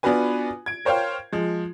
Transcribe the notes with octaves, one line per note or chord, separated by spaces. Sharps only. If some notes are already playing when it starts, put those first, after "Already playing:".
B3 D4 F4 F#4 B4 G#5
G#6 D7
A#4 C5 C#5 F5 G5 F6
F3 G#3